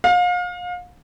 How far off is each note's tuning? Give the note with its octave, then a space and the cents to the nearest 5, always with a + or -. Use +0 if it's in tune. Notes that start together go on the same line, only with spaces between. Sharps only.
F5 +35